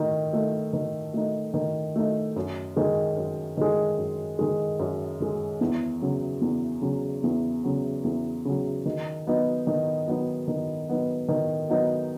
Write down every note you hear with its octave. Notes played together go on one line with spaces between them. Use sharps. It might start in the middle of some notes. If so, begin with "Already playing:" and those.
Already playing: D#3 A3
A3 D#4
D#3
A3 D#4
D#3
A3 D#4
F#2
D#3 G#3
F#2
D#3 G#3
F#2
D#3 G#3
F#2
D#3 G#3
E2
C#3 F#3
E2
C#3 F#3
E2
C#3 F#3
E2
C#3 F#3
D#3
F#3 B3 D#4
D#3
F#3 B3 D#4
D#3
F#3 B3 D#4
D#3
F#3 B3 D#4